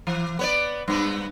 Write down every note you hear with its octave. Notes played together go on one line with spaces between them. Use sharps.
E3
B3 C#5 D5
G2 B3